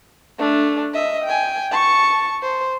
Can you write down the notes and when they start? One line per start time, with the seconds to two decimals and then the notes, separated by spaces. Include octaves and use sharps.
0.39 A3 D4
0.94 D#5 E5
1.25 G5 G#5
1.71 A5 C#6
2.42 C5